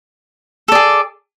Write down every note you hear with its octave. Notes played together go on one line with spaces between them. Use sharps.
G#4 A4 D5